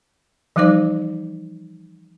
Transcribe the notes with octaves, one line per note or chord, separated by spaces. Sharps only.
E3 F3 G3 D#4 C5 D6